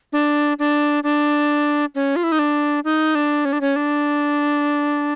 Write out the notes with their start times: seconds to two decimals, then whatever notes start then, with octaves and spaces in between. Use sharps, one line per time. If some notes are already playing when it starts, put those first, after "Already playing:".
0.12 D4
0.59 D4
1.04 D4
1.95 C#4
2.16 F4
2.24 E4
2.32 D#4
2.39 D4
2.84 D#4
3.15 D4
3.45 C#4
3.53 D4
3.61 C#4
3.76 D4